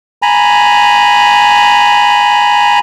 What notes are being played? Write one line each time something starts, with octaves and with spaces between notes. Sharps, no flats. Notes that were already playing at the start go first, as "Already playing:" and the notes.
G#5 A#5 B5